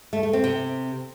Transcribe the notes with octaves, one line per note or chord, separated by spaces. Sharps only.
A3
A3
C4
C3